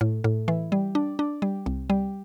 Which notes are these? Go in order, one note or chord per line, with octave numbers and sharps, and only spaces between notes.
A2
A2
E3
G3
D4
D4
G3
C2
G3